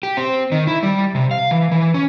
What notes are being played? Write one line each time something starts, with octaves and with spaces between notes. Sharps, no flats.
G4
C4
D#3
E4
G3
C3
F5
E3
E3
C#4